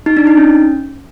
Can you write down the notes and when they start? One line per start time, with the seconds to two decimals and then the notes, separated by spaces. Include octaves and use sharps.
0.06 D#4
0.17 D4
0.27 D#4
0.37 C#4